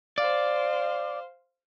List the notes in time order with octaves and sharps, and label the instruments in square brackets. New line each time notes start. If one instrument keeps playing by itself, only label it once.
[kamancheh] C5 F5 [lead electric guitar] D5